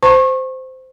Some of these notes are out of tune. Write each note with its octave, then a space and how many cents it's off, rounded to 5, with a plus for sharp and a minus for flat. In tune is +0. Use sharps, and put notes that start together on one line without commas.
C5 -15 A5 +25 C#6 -30